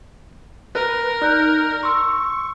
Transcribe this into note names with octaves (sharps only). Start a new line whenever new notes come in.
A#4 B4
D#4 D5 F#6 G6
C6 C#6 E6